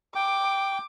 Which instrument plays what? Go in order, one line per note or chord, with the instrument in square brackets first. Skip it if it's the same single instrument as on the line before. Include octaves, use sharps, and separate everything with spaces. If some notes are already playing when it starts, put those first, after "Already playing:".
[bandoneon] G5 [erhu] D6